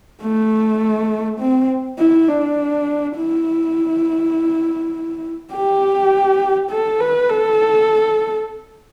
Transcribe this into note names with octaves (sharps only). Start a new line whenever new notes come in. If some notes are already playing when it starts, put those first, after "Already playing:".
A3
C4
E4
D4
E4
G4
A4
B4
A4